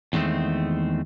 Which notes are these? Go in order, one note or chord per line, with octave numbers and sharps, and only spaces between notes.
E2 D#3 G#3 A3 C4